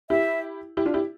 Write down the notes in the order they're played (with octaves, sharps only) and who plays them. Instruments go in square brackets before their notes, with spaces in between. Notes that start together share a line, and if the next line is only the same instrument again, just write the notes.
[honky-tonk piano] E4 G4 [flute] E5
[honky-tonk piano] E4 G4
D4 F4
E4 G4